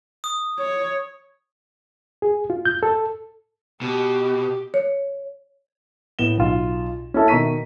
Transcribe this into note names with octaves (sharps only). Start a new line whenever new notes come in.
D#6
C#5
G#4
F4
G6
A4
B2 G4
C#5
A2 B3 E7 G7
B1 F4
C#4 E4 A4 E5
B2 D#3 A#5 C#6 B6 D#7